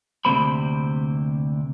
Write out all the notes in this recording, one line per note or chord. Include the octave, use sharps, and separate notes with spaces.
D2 C3 A#3 C5 B5